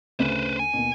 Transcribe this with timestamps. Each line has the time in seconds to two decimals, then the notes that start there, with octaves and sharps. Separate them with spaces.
0.20 D2 C#3 B4 C5
0.60 G#5
0.74 D#2 B2